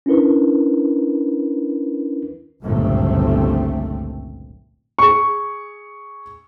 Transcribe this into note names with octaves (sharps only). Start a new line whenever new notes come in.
C#4 D4 E4 A#4 B4
G1 C#2 F#2 A#2 A3 C4
G#4 C#6